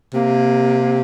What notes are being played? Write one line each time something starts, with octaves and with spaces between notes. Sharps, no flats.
C3 A#3